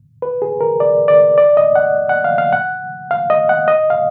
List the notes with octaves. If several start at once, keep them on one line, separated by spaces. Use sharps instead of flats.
B4
G#4
A#4
D5
D5
D5
D#5
F#5
F#5
F5
F5
F#5
F5
D#5
F#5
D#5
F5